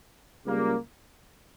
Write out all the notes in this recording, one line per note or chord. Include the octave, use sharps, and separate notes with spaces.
C#2 C#3 G3 A#3